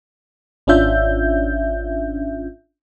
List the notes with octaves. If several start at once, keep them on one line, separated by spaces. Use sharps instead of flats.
G#1 C#4 D4 F4 E5 G6